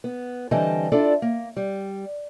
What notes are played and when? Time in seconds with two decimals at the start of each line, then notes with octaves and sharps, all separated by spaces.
0.04 B3
0.51 D3 E3 G3 C4 D#5 A5
0.92 D4 E4 F4 A4 D5
1.22 A#3
1.57 G3